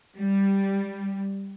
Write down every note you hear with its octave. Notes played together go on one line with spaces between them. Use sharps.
G3